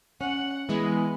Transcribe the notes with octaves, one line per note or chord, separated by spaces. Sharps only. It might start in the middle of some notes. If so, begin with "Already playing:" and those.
C#4 F#5
E3 G#3 B3